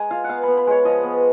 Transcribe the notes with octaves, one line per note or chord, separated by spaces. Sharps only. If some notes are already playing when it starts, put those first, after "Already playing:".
Already playing: G#3 G#5 A#5
F4 F5
F#5
B3 F5
B3 B5
B5
G#3 C#5
F3 D#5
B3